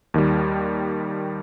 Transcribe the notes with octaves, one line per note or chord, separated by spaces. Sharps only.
D#2 D#3 G3